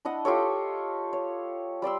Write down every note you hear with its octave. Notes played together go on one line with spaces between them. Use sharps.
D4 E4 D#5 F#5
F4 G4 A4 C#5
C#5
G3 D5 C6 E6